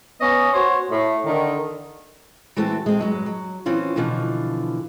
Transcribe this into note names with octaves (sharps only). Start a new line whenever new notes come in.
B3 C#4 D#5
F#4 C5 C#5
A2
D3 D#3
E3 G#3 A3 C4 F#4 A4
G#3 C4
G2 F#3 G#3
F#3
E3 C4 C#4 F4 C5
B2 D3 E3 F3 F4